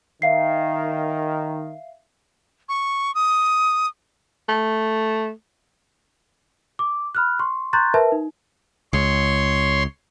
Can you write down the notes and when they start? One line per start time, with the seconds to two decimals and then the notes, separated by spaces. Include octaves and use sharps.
0.22 D#3 E5 F5 C7
2.69 C#6
3.15 D#6
4.49 A3
6.79 D6
7.15 B5 F6 F#6
7.39 C6 C#6
7.73 A#5 C6 C#6 F#6 G6 A6
7.94 A#4 B4 E5 A5
8.12 D#4
8.93 C#2 C#5 C6